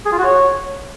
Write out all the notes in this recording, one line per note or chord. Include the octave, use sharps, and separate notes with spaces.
G#4
F4
F#4
C#5